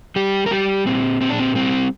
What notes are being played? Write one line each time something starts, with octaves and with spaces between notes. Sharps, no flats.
G3 G4
A#4
G3 G4
A#2 C4
A#2 C4
D4
C4
G3 C4